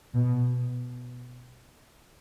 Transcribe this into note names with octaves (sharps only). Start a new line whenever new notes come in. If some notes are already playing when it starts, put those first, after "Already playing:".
B2